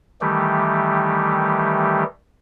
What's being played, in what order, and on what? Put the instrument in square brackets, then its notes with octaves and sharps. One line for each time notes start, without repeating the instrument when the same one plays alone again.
[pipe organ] D#3 E3 G3 A3 G4